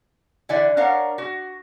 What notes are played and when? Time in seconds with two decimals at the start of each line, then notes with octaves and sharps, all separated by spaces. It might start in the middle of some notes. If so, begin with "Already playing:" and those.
0.49 D3 E3 E4 D5
0.77 D4 A#4 C#5 F5 F#5
1.18 F#4